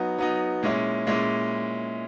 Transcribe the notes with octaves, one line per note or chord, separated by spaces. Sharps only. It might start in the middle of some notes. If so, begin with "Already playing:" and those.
Already playing: F#3 B3 D#4
F#3 B3 D#4
A#2 G#3 C#4 E4
A#2 G#3 C#4 E4